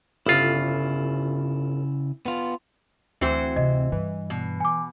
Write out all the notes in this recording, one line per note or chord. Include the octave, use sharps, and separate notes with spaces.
G1 C#3 E4 F4
B3 F4
D2 E3 C4 F#4 C5
C3 D#5
G2 E3
B2
G#5 D6